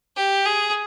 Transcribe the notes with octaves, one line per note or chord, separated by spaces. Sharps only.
G4
G#4